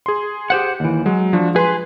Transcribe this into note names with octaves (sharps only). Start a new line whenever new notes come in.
G#4 C6
G4 C5 F#5
D#2 E3
F#3 G#3
F3 D4 F#4
G#4 B4 C6